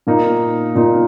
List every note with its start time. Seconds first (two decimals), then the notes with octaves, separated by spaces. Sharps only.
0.07 A#2 A#3 D#4
0.75 A#2 A#3 D#4